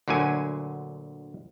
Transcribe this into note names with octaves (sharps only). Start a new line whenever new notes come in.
D2 A#2 D3 F#3 G#5